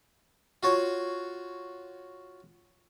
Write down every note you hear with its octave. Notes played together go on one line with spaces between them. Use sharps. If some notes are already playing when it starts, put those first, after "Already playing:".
F4 F#4 C#5